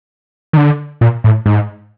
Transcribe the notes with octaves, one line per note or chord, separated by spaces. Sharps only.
D#3
D3
A#2
A2
G#2